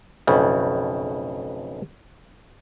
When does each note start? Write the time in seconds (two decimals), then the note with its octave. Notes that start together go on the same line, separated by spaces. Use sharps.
0.27 B1 F2 A2 C#3